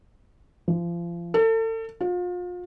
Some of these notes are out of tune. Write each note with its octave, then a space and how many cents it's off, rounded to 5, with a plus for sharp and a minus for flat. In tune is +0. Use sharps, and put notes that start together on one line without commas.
F3 -30
A4 +35
F4 +35